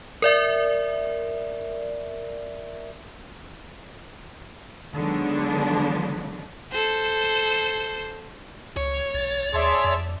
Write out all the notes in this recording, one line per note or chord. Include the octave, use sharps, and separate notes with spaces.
A#4 D5 E5
D3 D#3 F#3 G#3 B3 D4
A4 C5
C#2 C#5
B1 A6
D#2 G#4 D5 E5 A5 C6
F2